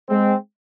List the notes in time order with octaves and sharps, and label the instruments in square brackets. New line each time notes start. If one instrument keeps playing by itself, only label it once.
[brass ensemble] G#3 C4